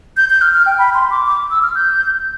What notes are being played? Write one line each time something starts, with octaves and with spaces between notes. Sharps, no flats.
G6
G6
F6
F6
G5
B5
C6
D6
D6
E6
F6
G6